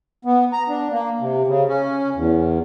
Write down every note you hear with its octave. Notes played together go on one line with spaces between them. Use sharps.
B3
A#5
D4
A#3
C3
C#3
C#4
E2